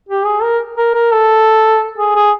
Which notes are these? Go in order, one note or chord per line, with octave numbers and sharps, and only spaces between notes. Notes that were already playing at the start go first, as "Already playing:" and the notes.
G4
G#4
A#4
A#4
A#4
A4
G#4
G#4